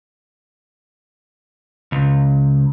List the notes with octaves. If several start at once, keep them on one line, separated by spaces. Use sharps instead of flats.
C#2